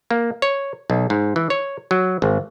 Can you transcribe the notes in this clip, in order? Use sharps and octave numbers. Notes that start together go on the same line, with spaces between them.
A#3
C#5
B1
G#2
E3
C#5
F#3
G#1